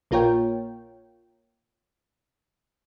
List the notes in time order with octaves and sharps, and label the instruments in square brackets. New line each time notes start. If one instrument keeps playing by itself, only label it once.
[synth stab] A#1 A#3 F4 A#4 C#5 G5